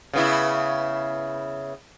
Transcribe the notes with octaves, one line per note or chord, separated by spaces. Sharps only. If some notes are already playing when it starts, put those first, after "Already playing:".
C#3 B3 E4